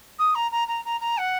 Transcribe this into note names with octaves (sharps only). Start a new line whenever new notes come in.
D#6
A#5
A#5
A#5
A#5
A#5
F#5